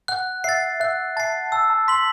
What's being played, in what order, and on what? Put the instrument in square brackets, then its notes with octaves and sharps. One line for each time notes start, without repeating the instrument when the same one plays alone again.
[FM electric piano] F#5 [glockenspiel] F#6
[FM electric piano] E5 [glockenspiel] A6 C7
[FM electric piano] E5 [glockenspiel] F#6
[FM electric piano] A5 [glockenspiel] A6 C7
[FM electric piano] A5 [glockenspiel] E6
[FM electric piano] A5
[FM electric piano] C6 [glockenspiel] B6 F#7